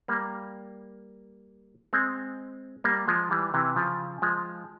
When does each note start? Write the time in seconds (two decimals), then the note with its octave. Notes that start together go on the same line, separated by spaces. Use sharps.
0.08 G3 A#3
1.93 G#3 C4
2.84 G3 A#3
3.08 F3 G#3
3.31 E3 G3
3.54 C3 E3
3.76 C#3 F3
4.22 F3 G#3